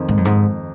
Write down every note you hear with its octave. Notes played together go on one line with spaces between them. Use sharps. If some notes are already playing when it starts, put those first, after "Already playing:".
Already playing: F2 D#3
G#2
F#2
G#2